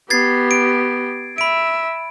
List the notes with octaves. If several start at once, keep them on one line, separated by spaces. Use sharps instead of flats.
B3 G4 G#6 A6 C7
D7
E5 B5 D7